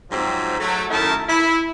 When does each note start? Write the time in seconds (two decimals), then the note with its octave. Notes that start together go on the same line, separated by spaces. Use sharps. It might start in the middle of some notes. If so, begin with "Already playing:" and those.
0.11 G#2 F3 F#3 C4
0.60 F#3 A3
0.90 F#2 D#3 A3 E4 A#4 A5
1.28 E4